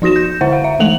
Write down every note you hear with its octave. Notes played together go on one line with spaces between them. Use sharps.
F3 D#4 F#4 A#6 E7
G6
D3 E4 C5 E5 F#5
F5
E5
E3 G#3 A3 A4 F7 F#7